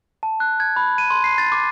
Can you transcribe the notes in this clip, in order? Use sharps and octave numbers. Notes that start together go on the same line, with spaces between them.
A5
F#6
G#6
B5
D#7
C6
C7
A6
D6